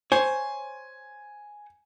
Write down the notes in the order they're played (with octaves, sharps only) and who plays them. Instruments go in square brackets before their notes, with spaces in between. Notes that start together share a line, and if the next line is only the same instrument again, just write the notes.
[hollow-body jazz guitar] C5 C#5 [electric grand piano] G#5